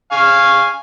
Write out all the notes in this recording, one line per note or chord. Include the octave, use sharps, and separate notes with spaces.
F5 G#5 C#6